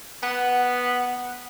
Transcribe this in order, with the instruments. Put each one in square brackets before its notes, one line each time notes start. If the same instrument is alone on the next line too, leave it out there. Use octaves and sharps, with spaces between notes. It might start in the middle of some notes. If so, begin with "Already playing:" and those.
[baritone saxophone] B3 [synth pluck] F#5